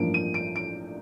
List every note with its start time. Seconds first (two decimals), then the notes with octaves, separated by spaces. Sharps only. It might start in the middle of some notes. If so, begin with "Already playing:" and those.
Already playing: A1 G2 F3 A#3 D7
0.14 D#7
0.34 D7
0.56 D7